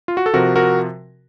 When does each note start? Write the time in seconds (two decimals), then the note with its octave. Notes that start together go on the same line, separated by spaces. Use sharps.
0.08 F4
0.17 F#4
0.26 A4
0.34 C3 F3 F#4 A#4
0.56 F#4 A#4